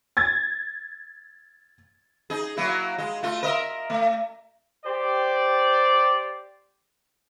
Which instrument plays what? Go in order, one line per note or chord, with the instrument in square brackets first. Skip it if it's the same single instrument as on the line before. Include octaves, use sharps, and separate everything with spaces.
[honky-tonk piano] G#6 A6
[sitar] D#4 G#4
F#3 A#3 E4
G#3
A3 F4
A#4 D#5 E5
A3
[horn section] G4 C5 D5